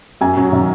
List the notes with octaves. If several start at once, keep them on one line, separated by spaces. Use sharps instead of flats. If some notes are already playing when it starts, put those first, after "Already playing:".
F#2 G#5
F#3
D#3